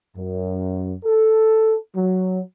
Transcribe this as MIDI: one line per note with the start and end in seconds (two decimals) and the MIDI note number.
0.17 0.94 42
1.05 1.76 69
1.96 2.39 54